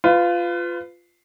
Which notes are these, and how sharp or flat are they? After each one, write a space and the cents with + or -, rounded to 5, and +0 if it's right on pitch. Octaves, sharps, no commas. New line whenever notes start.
F4 -5 B4 +30